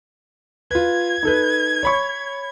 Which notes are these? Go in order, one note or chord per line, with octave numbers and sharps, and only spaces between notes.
F4 B4 G#6
D#4 A4 B4
C#5 B5 C#6